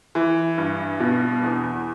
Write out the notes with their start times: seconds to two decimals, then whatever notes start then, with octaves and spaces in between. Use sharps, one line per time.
0.15 E3
0.58 G2
1.00 B2
1.43 E2